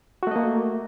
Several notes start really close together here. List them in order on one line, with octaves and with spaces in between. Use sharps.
F#4 A3 D#5 A#3